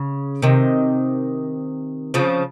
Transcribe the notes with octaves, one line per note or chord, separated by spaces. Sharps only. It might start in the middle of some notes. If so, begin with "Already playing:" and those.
Already playing: C#3
C3 D#3
C#3 F3